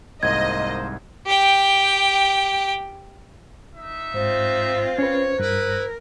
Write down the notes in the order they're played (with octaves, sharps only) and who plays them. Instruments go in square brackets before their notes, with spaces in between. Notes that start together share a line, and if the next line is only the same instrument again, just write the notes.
[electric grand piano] C2 G#2 [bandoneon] A#3 C5 [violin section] D#5 [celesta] G#6
[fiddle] G4 G5
[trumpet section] D#4 E5
[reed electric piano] G#2 [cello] C4 F4 [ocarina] C5
[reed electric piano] C#4 B4 [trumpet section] C#5
[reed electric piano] G2 [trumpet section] E4 B4 [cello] A#4